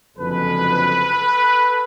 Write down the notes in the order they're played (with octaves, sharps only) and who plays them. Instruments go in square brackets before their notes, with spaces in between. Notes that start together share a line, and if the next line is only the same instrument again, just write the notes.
[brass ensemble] F#1 F2 D3 F3 G#3 A4 B4